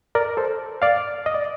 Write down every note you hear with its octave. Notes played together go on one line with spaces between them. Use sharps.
A#4 D5
A4 C5
D5 F5
D#5
D5